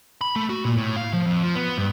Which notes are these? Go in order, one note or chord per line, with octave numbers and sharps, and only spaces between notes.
B5
A3
F#4
A#2
A2
F5
F3
F2
F3
B3
G2